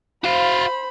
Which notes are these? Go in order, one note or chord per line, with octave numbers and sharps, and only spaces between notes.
F#4 C5 F5 B5